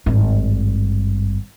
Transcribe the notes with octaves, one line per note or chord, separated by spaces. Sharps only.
G#1 G2